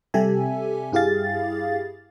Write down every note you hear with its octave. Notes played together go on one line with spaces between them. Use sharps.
C3 G3 G4 A4 E5 G#5
G2 E4 G4 G#4 F5 A6